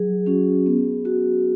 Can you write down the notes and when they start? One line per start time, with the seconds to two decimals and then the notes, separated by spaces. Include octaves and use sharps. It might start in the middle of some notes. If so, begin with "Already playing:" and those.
Already playing: F#3 G#4
0.26 C#4 F#4
0.66 B3
1.05 F#4